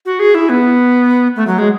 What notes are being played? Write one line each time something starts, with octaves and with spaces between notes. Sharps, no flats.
F#4
G#4
E4
B3
A3
F#3
G#3